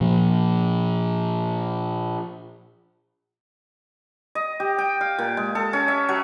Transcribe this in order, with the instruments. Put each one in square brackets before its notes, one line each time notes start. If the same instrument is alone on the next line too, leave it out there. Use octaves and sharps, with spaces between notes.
[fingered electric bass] A#2 F3
[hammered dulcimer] D#5
G4
G5
F5
A#2
G#3
A4
C#4
E5
F#3